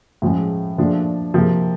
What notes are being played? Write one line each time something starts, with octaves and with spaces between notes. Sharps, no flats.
A2 F3 G#3 C#4
A#2 F3 A3 D4
C3 F3 A#3